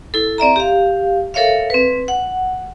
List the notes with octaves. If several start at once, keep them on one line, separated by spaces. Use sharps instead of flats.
E4 A4
C4 D5 E5 A#5
G4 F5
A4 A#4 C#5 E5 F5
C4 B4
F#5